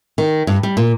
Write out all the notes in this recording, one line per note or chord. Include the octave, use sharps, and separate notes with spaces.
D#3
G2
G3
A#2